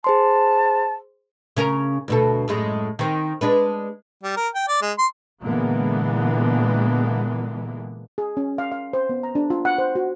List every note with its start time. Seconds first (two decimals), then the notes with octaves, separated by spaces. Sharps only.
0.04 G#4 C5 A5 C6
1.57 C#3 C#4 A#4
2.08 D2 B2 A4
2.48 F#2 A2 G#3
2.99 D#3 C4
3.41 G#3 D4 B4
4.23 G3
4.37 A#4
4.55 G5
4.68 D5
4.82 G#3
4.98 C6
5.43 A#2 D3 E3 G#3 A#3 B3
8.18 G#4
8.37 C#4
8.58 F5
8.72 F5
8.93 C5
9.09 B3
9.23 A#5
9.35 D4
9.50 F4
9.65 F#5
9.78 C5
9.95 F#4